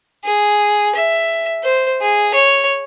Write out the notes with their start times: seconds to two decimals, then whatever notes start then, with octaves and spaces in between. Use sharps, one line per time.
0.24 G#4
0.95 E5
1.64 C5
2.02 G#4
2.34 C#5